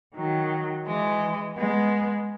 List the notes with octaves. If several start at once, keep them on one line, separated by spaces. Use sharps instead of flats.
D#3 F#3
E3 G#3
G#3 B3